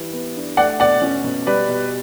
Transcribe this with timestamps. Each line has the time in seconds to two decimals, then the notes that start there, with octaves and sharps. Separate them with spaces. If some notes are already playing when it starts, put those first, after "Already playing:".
Already playing: E3 G3
0.13 B3
0.36 D4
0.57 A3 D5 F#5
0.80 B2 D5 F#5
1.02 C#4
1.24 B2
1.47 G3 B4 D5
1.69 B2